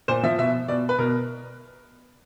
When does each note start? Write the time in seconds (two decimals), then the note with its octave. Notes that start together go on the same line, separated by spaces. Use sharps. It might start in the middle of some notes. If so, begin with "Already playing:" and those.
0.08 A#2 C5
0.23 F3 E5
0.38 B2 E5
0.68 B2 D5
0.89 B4
0.99 B2 A#4